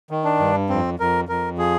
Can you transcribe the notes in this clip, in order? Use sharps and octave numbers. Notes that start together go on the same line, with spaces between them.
D#3
D4
G2
F2 C4
F2 A#4
F2 A#4
F3 G#4